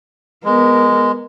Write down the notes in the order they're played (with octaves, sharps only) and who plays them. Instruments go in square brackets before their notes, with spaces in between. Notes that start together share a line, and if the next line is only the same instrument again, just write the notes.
[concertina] G#3 [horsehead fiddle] B3 A#4